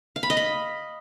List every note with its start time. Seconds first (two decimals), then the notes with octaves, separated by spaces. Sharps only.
0.16 F5
0.23 B5
0.30 D#5
0.37 B5